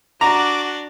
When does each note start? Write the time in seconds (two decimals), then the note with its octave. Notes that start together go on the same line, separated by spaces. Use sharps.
0.21 D4 F#4 A#5 D6